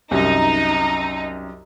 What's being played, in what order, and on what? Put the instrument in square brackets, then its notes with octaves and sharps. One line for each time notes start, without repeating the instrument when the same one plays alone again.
[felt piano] C2 F#2 [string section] D#4